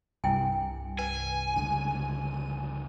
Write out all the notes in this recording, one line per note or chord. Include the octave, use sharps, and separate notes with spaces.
C2 G2 E4 G5 G#5
B4 G#5
C#2 G2 D3 D#7